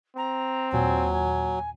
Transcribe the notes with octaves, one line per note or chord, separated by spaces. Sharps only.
C4 A#5
D#2 A#2 F#3 G#5
G#5